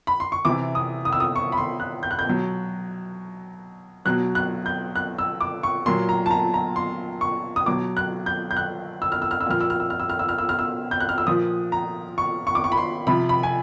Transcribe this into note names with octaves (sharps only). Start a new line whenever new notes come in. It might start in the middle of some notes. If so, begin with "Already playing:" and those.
B5
C6
C#6
C3 E3 D6
D#6
D#6
E6
D#6
C#6
B5
C6
F#6
G6
F#6
G6
B2 F#3
B2 F#3 F#6
F#6
G6
F#6
E6
D6
C#6
A#2 F#3 C6
A#5
A5
A#5
A#5
C6
C#6
D#6
B2 F#3 D6
F#6
G6
G6
F#6
E6
F6
E6
F6
E6
A#2 F3 F6
E6
F6
E6
F6
E6
F6
E6
F6
E6
F6
E6
G6
F#6
F6
E6
A#2 F3 D#6
A#5
C#6
C#6
D6
C#6
B5
C6
C3 F3 B5
B5
G#5